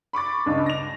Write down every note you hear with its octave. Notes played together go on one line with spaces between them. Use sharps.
B5 C#6 D6 A6
C#2 G2
A#6 F7